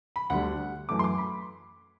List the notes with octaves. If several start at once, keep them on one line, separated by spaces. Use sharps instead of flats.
B5
D2 D3 G3 F#5
F#2 E3 A3 D6
C6
D6
B5